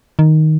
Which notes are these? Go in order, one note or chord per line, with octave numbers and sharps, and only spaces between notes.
D#3